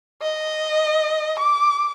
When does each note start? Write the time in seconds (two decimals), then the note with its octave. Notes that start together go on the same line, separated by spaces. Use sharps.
0.22 D#5
1.39 D6